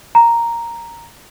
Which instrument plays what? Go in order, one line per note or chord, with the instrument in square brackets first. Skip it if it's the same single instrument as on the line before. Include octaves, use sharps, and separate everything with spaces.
[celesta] A#5